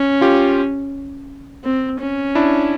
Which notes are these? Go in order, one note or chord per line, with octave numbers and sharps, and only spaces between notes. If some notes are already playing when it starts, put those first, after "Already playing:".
Already playing: C#4
F4 G4
C4
C#4
D4 E4